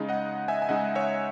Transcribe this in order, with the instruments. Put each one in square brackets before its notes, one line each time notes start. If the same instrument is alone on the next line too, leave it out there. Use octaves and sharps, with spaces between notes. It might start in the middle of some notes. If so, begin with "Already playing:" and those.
Already playing: [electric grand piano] C#3 G#3 D#4
D#5 F#5
E5 G#5
G#5
C#3 G#3 D#4 D#5 F#5
C#5 E5